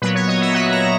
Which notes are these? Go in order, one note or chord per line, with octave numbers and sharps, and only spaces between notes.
A#2 F#3 B3 B4
C#5
D#5
E5
A#2 F#3 B3 F#5
A#5